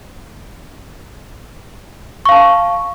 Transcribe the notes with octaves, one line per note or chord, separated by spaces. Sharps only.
F5 A5 C#6